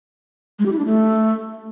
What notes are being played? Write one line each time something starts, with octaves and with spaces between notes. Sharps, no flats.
G#3
G4
E4
D4
A3